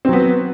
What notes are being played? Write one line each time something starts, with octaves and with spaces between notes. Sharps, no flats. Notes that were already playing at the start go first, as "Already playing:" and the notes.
F#3 B3 C4